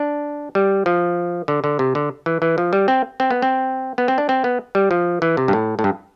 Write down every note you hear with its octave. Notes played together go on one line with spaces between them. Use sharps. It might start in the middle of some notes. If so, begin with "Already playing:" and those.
Already playing: D4
G3
F3
D3
D3
C3
D3
E3
E3
F3
G3
C4
C4
B3
C4
B3
C4
D4
C4
B3
G3
F3
E3
C3
G2
A2
A2
G2